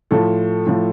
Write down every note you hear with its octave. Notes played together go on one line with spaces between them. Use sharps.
A2 F3 A4
A2 F3